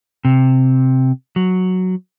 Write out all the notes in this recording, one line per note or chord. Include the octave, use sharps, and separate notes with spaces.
C3
F#3